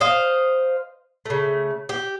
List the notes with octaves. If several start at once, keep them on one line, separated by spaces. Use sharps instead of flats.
C5 D#5 F5
C#3 A3
G4